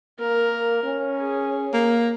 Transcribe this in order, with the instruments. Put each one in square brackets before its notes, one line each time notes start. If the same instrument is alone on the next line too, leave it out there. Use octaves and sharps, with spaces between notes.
[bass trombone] A#3 [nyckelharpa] A#4
[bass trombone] C#4
[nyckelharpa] G#4
[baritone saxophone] A#3